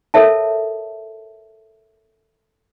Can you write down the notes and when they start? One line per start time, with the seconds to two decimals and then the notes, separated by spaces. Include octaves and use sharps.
0.14 A4 A#4 C#5 E5 A5